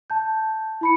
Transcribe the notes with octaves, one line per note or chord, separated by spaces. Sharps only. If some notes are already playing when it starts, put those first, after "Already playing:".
A5 G6
E4 B5 C#7